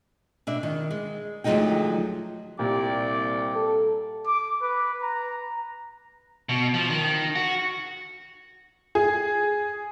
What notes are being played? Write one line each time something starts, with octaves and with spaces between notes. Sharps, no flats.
B2 D4 E5
D#3
G#3
D2 F3 F#3 G#3 D#4 G5
C2 A#2 G4 D5
A4
D6
B4
A#5
B2
F3
D#3
F#4
G#4